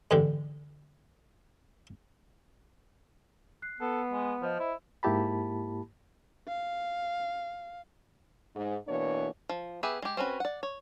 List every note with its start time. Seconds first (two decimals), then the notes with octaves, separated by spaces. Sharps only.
0.11 E2 G#2 D3 G4
3.62 F#6 C7
3.80 B3 A4
4.12 G#3
4.42 F3 C5 D#5
4.59 E4
5.03 G#2 A#3 E4 G4 A5 B5
6.48 F5
8.56 G#2
8.88 B2 E3 A#3 D4 C#5
9.49 F3
9.83 B3 G4 G#4 B4 E5
10.02 G#3 G4
10.17 C4 C#4 F#4 B4
10.40 D5 F#5
10.63 C#5